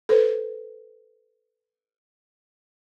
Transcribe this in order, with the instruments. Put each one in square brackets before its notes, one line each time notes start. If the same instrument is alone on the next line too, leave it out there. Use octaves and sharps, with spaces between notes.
[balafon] A4 B4 C5